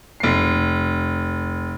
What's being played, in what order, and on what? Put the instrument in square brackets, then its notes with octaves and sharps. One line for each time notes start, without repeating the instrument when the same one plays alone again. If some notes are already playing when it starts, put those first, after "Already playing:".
[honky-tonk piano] F1 C7